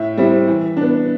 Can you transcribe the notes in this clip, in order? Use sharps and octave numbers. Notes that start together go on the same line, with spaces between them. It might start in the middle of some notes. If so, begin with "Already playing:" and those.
Already playing: A2 E5
G3 C4 E4
E3
B3 D4